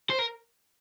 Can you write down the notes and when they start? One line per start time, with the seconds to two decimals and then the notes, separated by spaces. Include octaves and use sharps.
0.10 C5
0.19 A#4